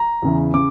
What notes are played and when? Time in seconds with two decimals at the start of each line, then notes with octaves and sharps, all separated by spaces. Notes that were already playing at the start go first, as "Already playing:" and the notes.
Already playing: A#5
0.22 E2 C#3 E3
0.54 C#3 D6